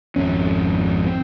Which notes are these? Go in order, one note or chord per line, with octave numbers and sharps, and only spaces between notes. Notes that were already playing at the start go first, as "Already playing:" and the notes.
G#1 F2 C#4
C4